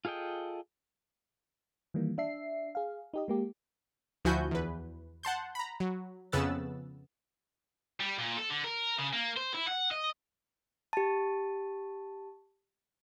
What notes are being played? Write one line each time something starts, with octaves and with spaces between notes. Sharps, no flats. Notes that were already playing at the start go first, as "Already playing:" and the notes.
F4 G#4 A4 D#5 G5
D#3 E3 G3 A#3
D4 E5 C7
G#4 F5
D#4 G4 D#5
G#3 A#3 G4
D2 F3 E4 F#4 G#5 G6
E2 B4
F#5 A5 C6 G6
A#5 B5
F#3
F2 C#3 B3 E6 F#6 A6
G3
A#2
A4
D3
A#4
C#3
A#3
C5
E4
F#5
D#5
G4 A5